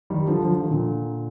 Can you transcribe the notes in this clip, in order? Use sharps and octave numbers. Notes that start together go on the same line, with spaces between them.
D#3 G3
D3 F3
D3 F3
F3
D#3
A#2 D3